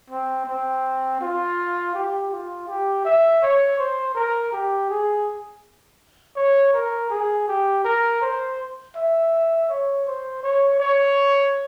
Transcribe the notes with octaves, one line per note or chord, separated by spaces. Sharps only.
C4
C4
F4
G4
F4
G4
E5
C#5
C5
A#4
G4
G#4
C#5
A#4
G#4
G4
A#4
C5
E5
C#5
C5
C#5
C#5